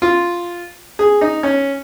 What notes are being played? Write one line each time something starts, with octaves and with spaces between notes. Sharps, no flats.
F4
G#4
D#4
C#4